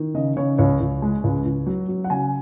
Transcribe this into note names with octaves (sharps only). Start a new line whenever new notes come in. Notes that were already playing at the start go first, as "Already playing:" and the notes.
Already playing: D#3
C#3 D#5
C#3 C#5
C#2 C#5
C#2
G#3
C#2
C#2
F#3
F#3
F#5
C#3 G#5